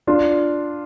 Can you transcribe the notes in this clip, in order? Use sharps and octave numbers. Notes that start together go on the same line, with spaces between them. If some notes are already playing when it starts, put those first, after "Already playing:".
D4 F4